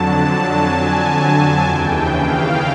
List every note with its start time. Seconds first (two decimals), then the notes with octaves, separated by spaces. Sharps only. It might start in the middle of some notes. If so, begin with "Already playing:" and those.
Already playing: F2 D3 F#3 A5
0.55 G#5
1.62 D#2 C#3 E3 G5
2.15 F5